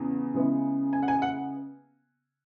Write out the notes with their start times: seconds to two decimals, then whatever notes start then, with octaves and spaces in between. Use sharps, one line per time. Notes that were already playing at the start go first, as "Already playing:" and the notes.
Already playing: E2 C#3
0.34 C#3 G#3 B3 E4
0.93 G#5
1.03 F#5
1.08 G#5
1.22 F#5